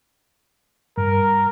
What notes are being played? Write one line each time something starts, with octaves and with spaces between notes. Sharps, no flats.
G2 A#4